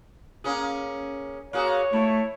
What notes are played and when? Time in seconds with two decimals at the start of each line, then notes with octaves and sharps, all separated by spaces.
0.44 A#3 C#4 G#4
1.53 A#3 F#4 G#4 C#5
1.93 A3 E4